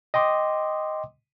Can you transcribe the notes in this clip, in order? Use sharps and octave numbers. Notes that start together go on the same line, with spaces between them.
D#5 G5 C6 D6 D#6